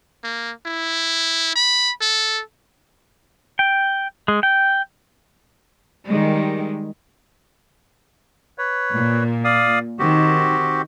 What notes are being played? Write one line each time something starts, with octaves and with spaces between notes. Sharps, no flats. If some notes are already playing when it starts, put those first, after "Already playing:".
A#3
E4
B5
A4
G5
G#3
G5
D#3 G3 G#3
B4 C#5
A#2
D5 F5 D#6
D#3 C4 F#4 G4